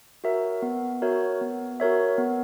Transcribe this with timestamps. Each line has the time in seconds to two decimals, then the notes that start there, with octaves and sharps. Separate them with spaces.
0.24 F#4 A#4 C#5 E5
0.62 B3
1.02 F#4 A#4 C#5 E5
1.41 B3
1.80 F#4 A#4 C#5 E5
2.18 B3